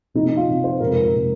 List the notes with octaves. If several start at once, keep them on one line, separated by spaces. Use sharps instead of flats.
C3 F3 C4 D#4
D#4
F4
C3 F3 C4
C5
F2 C3 G#3 A#4
A#4
A#4
C3 G#3